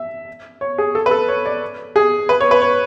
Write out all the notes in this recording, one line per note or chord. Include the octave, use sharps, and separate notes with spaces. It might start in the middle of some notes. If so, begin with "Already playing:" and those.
Already playing: E5
C#5
G#4
A4
B4
A4
C#5
D5
G#4
B4
C#5
B4
C#5